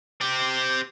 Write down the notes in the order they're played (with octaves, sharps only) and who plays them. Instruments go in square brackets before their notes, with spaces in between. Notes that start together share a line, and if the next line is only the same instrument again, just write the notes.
[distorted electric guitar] C4 G4